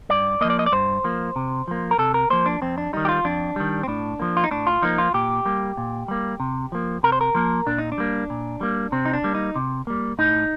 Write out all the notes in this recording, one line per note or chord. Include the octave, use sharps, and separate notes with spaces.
G2 D5
F3 A#3 D#5
D5
D#5
D5
G2 C5
F3 A#3
C3
F3 A#3
A#4
C3 A4
A#4
F3 A#3 C5
D4
F2 C4
D4
D#3 G3 D#4
G4
F4
F2 D4
D#3 G3
C4
A2 D4
F3 A#3
F4
D#4
A2 D4
F4
F3 A#3 D#4
F4
A#2 G4
G3 A#3
A#2
G3 A#3
C3
F3 A#3
C3 A#4
C5
A#4
F3 A#3
A#2 D4
D#4
D4
G3 A#3
A#2
G3 A#3
C3 C4
D#4
D4
G3 A#3
D#4
C3
G3 A#3
A2 D#4